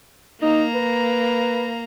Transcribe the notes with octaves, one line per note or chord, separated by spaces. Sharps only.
A#3 D#4 A#5
B4